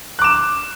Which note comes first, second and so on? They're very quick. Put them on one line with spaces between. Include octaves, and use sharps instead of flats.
F#6 D6 E7